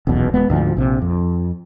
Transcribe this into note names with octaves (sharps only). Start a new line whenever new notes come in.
D#1 B1 E2 B2
D#1 G#3 B3
D2 G#2 F3
A#1 C3
F2